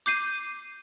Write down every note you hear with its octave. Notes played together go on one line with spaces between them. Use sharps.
D6 G6 C7 D#7